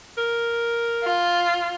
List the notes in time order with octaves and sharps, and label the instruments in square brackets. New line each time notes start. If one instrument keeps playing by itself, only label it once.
[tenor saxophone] A#4
[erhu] F4